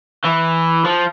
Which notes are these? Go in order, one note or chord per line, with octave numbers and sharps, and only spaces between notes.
E3
F3